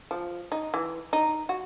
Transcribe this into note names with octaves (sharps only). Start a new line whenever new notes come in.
F3
D#4
E3
D#4
F#4